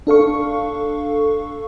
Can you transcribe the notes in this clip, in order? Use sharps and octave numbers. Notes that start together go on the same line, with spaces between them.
D4 A4 F5 C#6